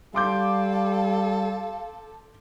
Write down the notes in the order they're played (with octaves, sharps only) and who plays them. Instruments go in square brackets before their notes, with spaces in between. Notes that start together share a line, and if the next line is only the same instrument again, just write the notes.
[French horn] G3 [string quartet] A4 [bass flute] F5 [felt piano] C6 D6 G6